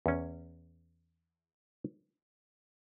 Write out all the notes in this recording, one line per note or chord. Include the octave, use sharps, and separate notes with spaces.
E2 C#4